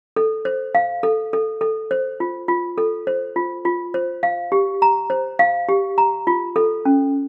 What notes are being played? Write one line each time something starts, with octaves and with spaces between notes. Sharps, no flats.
A4
C5
F5
A4
A4
A4
C5
F4
F4
A4
C5
F4
F4
C5
F5
G4
A#5
C5
F5
G4
A#5
F4
A4
C#4